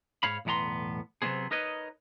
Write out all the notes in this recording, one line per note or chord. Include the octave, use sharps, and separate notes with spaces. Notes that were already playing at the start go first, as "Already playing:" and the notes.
G#2 C#5 F5 B5
B1 E2 A2 B3 A#5 C6
C3 F#3 A3 B3 C4 G#4
D#4 A#4 B4 C#5 D#5